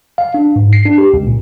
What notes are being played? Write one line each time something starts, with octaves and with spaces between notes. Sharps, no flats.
F5
D4
G#2
C7
D4
G4
C#2
A#2